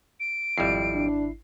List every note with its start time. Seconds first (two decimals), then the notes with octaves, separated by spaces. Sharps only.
0.20 D7
0.58 G#1 F2 G3 E4 C7
0.94 D4